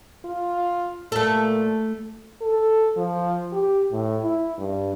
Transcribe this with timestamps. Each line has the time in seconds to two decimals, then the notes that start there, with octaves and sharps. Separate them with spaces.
0.25 F4
1.12 A#2 A3 A4
2.41 A4
2.97 F3
3.52 G4
3.91 A2
4.22 E4
4.58 G2